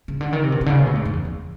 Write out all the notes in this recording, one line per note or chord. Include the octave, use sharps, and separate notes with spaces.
C#3
D3
D#3
C3
B2
C3
D3
C#3
B2
A2
G#2
F2
E2
E2